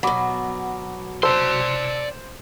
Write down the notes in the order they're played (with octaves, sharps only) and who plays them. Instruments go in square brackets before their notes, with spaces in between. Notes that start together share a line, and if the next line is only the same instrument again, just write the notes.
[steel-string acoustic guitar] B2 F#3 [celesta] F#5 B5 D6
[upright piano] C5 [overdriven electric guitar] D5 C6 [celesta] A5 E6